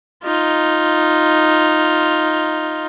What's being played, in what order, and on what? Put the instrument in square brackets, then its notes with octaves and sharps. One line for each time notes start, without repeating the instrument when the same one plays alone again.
[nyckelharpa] D#4 F4